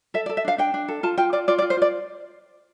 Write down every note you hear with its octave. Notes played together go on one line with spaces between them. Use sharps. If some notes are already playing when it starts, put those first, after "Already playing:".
A4 E5
D5
A4
E5
D4 F5
D4 G5
D4
A4
F4 A5
F4 G5
F4 D5
F4 D5
D5
F4
C5
F4 D5